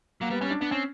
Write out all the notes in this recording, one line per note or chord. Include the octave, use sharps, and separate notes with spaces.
F#3 A#3
G3 B3
G3 C#4
D4
B3 D4
C4 C#4